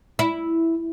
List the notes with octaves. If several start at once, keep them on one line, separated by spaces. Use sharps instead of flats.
E4